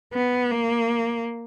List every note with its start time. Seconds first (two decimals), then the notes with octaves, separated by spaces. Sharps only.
0.13 B3
0.51 A#3